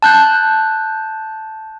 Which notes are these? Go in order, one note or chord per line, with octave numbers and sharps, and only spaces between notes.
A5 F#6 G6